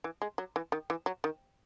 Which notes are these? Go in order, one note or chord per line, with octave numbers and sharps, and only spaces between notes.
E3
G#3
F#3
E3
D#3
E3
F#3
D#3